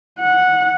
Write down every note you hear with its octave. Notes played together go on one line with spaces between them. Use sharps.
F#5